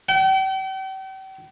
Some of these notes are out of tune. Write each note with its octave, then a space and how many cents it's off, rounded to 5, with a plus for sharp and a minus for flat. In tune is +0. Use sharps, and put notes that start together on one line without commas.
G5 -40